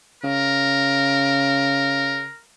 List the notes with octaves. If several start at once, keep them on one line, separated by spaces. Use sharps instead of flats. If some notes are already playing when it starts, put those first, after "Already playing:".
C#3 A#4